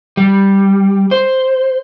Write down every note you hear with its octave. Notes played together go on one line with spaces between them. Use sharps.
G3
C5